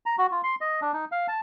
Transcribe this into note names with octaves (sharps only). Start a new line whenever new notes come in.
A#5
F#4
F4
C6
D#5
D4
D#4
F5
A5